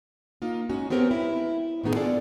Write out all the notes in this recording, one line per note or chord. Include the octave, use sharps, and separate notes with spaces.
A#3 D#4 F4
G#3 C#4 D#4 F#4
B3 C4 G4 A#4 B4 C#5
E4
A2 D#3 B3 D#4 G#4
B3 D4 F4 G#4 A4 D5